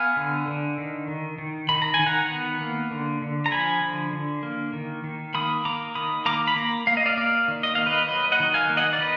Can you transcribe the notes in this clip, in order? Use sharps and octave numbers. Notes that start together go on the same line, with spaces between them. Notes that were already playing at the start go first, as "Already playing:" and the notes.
Already playing: B3 F5 G#5
D3
D3
D#3
D#3
D#3
D#3 B5
A#5
G#5
D#3
F#5 A#5
B3
A#3
D3
D3
A#5
F3 G#5 B5
D3
D3
A#3
D#3
D#3
A#3 B5 D#6
A#3 A#5 D6
D#3 B5 D#6
A#3 A#5 D6
B5
A#3 A#5 D6
A#3 F5
D#5
D5 F5
A#3 D5 F5
D#3
D#5
A#3 F5
B4 D#5
F#3 B4 D#5
D#5 F#5
D#3
F5 G#5
A#3
D#5 F#5
D5
D#3 B4 D#5